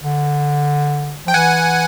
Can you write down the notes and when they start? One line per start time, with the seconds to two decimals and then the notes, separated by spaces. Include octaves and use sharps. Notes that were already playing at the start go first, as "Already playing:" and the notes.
0.03 D3
1.27 F3 G5
1.34 E3 F#5 G#5